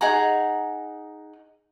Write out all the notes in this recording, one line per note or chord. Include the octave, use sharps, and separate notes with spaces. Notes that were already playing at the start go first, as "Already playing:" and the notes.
D#4 G#4 F#5 A#5